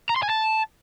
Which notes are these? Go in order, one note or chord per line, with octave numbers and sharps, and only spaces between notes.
A#5
C6
G#5
A5